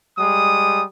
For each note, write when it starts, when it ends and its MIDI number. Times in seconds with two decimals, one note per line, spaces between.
0.18 0.84 55
0.18 0.84 56
0.18 0.84 87